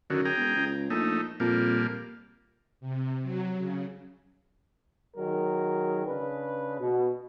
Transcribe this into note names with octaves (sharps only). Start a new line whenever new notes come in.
F#2 D3 D#3 F#3
G#4 G5 A#5
E1
C#2
A#1 A3 D#4
F2 A#2 G3 A#3
C3
F#3
C#3
D#3 F#3 G#4 A#4
C#3 D4 B4
B2